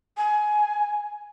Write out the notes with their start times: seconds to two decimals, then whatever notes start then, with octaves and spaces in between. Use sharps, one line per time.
0.17 G#5